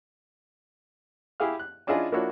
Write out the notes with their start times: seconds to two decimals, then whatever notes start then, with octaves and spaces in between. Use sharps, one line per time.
1.40 E4 G4 G#4 F5 F6
1.59 F#6
1.87 C#4 D4 E4 F4 G#4 D#5
2.12 F3 A#3 D4 E4 F#4 C#5